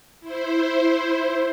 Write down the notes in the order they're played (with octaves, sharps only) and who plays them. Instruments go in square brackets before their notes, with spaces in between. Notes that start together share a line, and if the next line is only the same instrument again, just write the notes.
[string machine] E4 C5